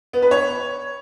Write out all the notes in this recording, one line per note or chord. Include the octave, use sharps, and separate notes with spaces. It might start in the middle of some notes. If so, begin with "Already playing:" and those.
B3
B4
C#5